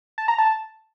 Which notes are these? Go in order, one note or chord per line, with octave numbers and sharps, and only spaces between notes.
A5
A#5
A5